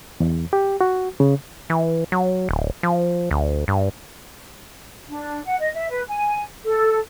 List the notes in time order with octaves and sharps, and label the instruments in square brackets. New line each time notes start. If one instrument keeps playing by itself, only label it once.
[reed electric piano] E2
G4
F#4
C#3
[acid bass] E3
F#3
D1
F3
D2
G2
[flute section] D4
F#5
D#5
E5
B4
G#5
A4